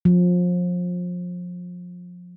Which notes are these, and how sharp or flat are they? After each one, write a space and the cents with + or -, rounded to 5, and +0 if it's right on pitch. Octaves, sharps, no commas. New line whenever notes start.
F3 +30